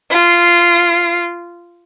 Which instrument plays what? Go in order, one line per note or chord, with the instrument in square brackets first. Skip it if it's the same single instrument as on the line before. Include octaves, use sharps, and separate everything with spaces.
[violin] F4 C7